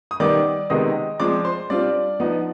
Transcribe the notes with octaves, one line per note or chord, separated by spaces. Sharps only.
D#6
D#3 G3 B3 D5 D6
C3 D#3 G#3 B3 D#5 D#6
F3 G#3 C4 D5 D6
C5 C6
G3 C4 D4 F4 D5
F3 B3 D#4